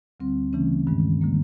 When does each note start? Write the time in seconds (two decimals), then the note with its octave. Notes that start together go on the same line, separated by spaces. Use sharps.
0.20 D2 D3 G3 C4
0.53 C#3 E3 A3 C#4
0.87 G2 D#3 G#3
1.21 D3 G3 A#3